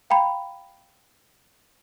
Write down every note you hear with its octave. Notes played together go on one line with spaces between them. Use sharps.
F5 G5 A#5 B5